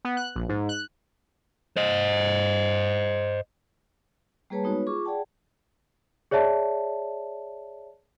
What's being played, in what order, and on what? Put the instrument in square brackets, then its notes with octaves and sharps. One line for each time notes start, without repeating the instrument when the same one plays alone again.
[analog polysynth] B3
F#6
A#1
G#2
F#6
[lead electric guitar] C5 D#5
[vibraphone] G3 A#3 G#4 B4 C#5 A5
G#3 B3 D#4 F#4 B4 C#5
F4 G#4 C#6 D6
G#4 D5 F#5 G5 A5
[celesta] G#4 C#5 D5 E5 A5